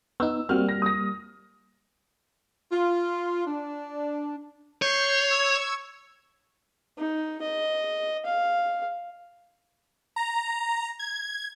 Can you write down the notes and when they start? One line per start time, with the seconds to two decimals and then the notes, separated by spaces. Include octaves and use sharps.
0.20 B3 D#4 E6
0.49 G3 A#3 C4 F#4 F6
0.69 A#6
0.82 D#6 A#6
2.72 F4
3.47 D4
4.82 C#5 G6 C7
5.29 C#6 E6 G#6
6.98 D#4
7.42 D#5
8.26 F5
10.16 A#5
10.99 G#6